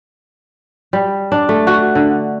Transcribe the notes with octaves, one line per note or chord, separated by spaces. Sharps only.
G3
D4
A3
F#4
D3